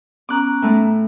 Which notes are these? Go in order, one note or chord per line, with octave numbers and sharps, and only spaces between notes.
B3 C#4 A#5 D6 F#6
A2 A3